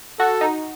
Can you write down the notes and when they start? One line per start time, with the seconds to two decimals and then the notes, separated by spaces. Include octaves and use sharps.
0.19 F#4 A4
0.41 D#4